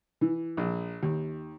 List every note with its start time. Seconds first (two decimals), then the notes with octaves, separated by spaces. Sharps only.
0.21 E3
0.57 A#1
1.03 D#2